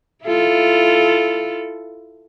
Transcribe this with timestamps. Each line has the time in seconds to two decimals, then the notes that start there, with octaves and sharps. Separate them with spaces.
0.25 E4 F4 A4